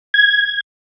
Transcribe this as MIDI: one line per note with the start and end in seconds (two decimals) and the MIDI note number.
0.14 0.60 92